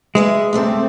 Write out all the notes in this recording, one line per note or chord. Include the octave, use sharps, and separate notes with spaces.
G#3 G#4 B4 E5
C3 A3 C4 D5 E5